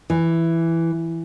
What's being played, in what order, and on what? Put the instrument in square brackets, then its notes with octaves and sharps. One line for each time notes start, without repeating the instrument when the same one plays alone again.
[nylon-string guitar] E3